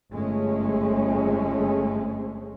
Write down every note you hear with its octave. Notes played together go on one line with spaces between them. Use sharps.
G1 G#3 A3 C#4